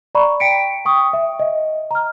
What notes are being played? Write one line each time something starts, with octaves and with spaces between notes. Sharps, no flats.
D5 A#5 B5 C#6
G5 B6 C#7 D7
G5 C#6 D#6
E5
D#5
A#5 F6